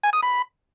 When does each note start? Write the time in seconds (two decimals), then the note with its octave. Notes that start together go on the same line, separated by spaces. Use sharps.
0.03 G#5
0.13 D#6
0.23 B5